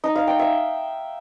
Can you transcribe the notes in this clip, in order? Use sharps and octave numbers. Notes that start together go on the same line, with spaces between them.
D#4
F5
G5
E5